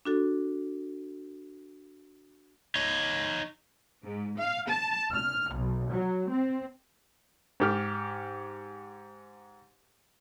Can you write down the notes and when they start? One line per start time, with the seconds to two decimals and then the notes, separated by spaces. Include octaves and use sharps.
0.05 D4 F#4 A4
2.75 D#4 C#5
4.03 G#2
4.39 F5
4.70 A5
5.12 F6
5.53 B1
5.91 F#3
6.28 C4
7.60 G#2 G4 F6